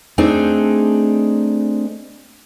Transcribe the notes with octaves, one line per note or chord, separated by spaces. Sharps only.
A3 C4 D4 D#4 G#4